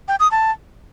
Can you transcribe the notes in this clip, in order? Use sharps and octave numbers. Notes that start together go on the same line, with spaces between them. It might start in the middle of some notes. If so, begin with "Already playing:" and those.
G5
D#6
A5